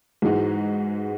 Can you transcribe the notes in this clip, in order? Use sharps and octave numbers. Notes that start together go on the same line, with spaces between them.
G#2 E3 G#3 D#4 F#4